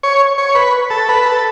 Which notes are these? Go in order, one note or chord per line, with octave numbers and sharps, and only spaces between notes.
C#5
C#5
B4
A4
B4
A4